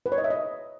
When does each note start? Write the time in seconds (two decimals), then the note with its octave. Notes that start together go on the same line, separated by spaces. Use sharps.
0.06 B4
0.12 C#5
0.18 D#5
0.24 E5
0.30 D#5